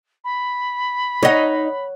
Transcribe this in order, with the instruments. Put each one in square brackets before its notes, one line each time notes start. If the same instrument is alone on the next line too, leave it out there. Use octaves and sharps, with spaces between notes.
[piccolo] B5
[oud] D#4 D#5 [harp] C#5 F#5